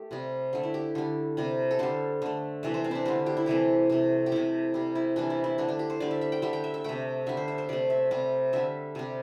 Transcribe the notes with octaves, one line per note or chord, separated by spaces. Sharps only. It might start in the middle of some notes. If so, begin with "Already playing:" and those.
Already playing: A3 G4 A4
C3 G3
D3 A3
E4
G4
D3 G3
C3 G3
A4
D3 G3 C5
D3 A3
C3 E3 A3 E5
C5
C4
D4 E4
D3 G3 C5
G4
E4
C3 E3 A3 G4
C3 A3
G4
C3 A3 E4
C3 G3
E4
C3 E3 G3 D4
E4
E4
D3 A3 D4
D4
G4
C5
D3 G3 D5
E5
E5
G5
D3 G3 E5
G5
E5
E5
C3 A3 G5
D3 G3 E5
C5
E5
C5
C3 A3 D5
E5
C3 G3
D3 G3 E5
C3 G3